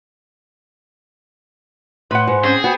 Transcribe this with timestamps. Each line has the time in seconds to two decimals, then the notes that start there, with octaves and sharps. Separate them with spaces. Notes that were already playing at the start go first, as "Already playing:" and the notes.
2.11 A2 B4 F#5 C6
2.27 G#2
2.44 C4 C#4 G#4 C5
2.64 B3 F#4 C5 G5